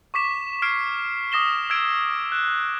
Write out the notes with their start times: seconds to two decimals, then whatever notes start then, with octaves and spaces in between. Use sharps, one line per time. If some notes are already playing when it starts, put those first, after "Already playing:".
0.14 C#6 D6 B6 E7
0.62 F6 G#6 C7 D7 E7
1.32 D6 D#6 A#6 E7 G7
1.70 E6 F6 G#6 D7
2.32 F#6 E7